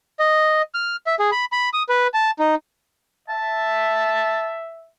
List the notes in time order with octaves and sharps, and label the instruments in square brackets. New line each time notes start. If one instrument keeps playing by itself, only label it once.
[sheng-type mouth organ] D#5
F6
E5
G#4
B5
B5
D#6
B4
A5
D#4
[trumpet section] E5 [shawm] A5